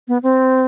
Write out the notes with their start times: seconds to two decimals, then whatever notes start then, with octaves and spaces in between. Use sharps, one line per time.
0.08 B3
0.23 C4